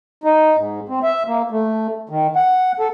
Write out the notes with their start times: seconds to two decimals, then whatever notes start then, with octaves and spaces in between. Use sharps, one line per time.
0.24 D#4
0.56 G#2
0.89 C4
1.03 E5
1.27 A#3
1.50 A3
2.09 D#3
2.36 F#5
2.80 A4